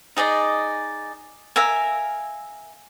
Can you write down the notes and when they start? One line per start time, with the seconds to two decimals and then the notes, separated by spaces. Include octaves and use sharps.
0.17 D#4 G#4 D5 D#5
1.56 A#4 E5 F5 G#5